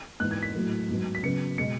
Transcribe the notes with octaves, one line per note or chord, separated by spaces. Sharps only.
G#2 E3 B3 F#6
G#6
B6
A2 F#3 A3
G#2 F#3 B3
B6
C#3 F#3 B3 C#7
B2 G#3 C#7